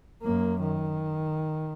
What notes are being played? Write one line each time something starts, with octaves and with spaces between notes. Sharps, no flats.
F#2 A#3
D#3